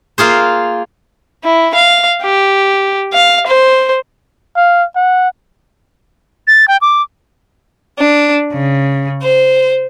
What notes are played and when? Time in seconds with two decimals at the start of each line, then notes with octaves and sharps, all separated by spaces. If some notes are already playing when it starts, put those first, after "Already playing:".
0.18 A#3 F4 G#4 C5
1.44 E4
1.74 F5
2.22 G4
3.13 F5
3.47 C5
4.56 F5
4.96 F#5
6.47 A6
6.68 G5
6.82 D6
7.98 D4
8.53 C#3
9.21 C5